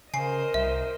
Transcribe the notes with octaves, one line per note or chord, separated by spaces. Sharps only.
C#3 A#4 C5 D#5 G#5 C7
C2 E5